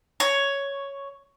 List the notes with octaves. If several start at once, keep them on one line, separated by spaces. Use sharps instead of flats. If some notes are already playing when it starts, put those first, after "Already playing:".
C#5